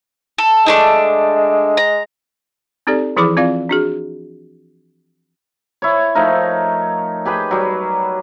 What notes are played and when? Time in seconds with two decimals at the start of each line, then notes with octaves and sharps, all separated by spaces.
0.38 A4
0.66 G#3 A3 D4 D#4
1.77 A#5
2.87 C4 D#4 G4 A4 D5
3.16 E3 F3 E4 G#4 B5 D6
3.37 C4 F4 D5 F5
3.69 D4 F#4 G#4
5.82 E4 C#5
6.15 F3 A3 D#4 A#4
7.25 G4 G#4 B4 G5
7.51 F#3 G3